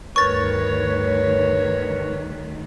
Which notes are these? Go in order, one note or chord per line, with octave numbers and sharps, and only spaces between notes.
D2 G2 D#3 A#4 B4 C#5 C#6 A6